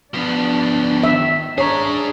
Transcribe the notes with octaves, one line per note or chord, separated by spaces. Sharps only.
F3 B3 D4
D#3 E5
D4 G#4 C#5 A#5